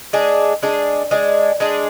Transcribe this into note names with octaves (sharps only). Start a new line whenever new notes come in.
G#3 D4 G#4
G#3 D4 G#4
G#3 D4 G#4
G#3 D4 G#4